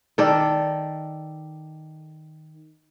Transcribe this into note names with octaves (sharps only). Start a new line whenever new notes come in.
D#3 A4 D5